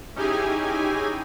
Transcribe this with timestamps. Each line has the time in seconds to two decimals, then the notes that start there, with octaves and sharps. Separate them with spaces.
0.16 C#4 D#4 E4 G4 G#4 G#5